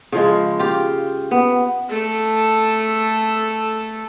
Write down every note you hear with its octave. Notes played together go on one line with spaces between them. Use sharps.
C#3 F3 G#3
F4 G4
B3
A3 A4